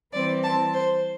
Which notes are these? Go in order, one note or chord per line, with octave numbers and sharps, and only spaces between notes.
E3 G3 C4 D5
A5
C5